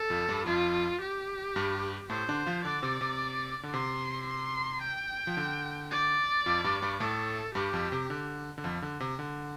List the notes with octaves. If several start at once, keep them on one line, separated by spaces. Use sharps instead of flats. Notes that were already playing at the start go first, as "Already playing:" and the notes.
Already playing: A4
F2 F3
G2 G3
F2 F3 F4
G4
G2 G3
A2 A3 C5
D3 D4
F3 F4
D3 D4 D5
C3 C4
C3
D3
C3 C6
C6
G5
F3
D3
D5
F2 F3
G2 G3
G2 G3
A2 A3 A4
G2 G3 G4
F2 F3
C3
D3
D3
F2 F3
D3
C3
D3